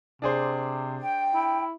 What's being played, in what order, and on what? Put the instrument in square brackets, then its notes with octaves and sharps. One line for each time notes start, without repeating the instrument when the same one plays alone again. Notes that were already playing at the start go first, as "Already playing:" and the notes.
[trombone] C3 [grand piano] D4 G#4 C5
[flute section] G5
[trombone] E4